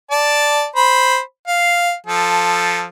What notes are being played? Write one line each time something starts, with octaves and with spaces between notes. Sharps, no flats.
D5 A5
C5 B5
F5
F3 A4